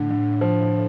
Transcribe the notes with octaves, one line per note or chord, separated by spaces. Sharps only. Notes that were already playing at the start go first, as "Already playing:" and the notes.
Already playing: A2 D3
D3
F3